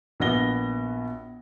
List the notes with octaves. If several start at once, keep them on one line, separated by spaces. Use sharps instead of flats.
A#1 B3 F#4 A#6 G7